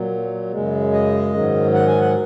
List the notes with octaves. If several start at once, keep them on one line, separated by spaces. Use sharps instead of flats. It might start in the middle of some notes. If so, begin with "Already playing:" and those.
Already playing: A#2 F#3
F#2 C#3 G#3
D#5
G#2 D#3 F#3
F#5
G#5
F#5